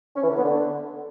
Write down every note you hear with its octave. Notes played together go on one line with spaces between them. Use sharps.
C#4
E3
D3
B3
D3